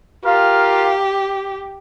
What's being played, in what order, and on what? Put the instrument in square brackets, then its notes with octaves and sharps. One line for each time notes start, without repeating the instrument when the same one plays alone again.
[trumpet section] F4 A#4 F5 [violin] G4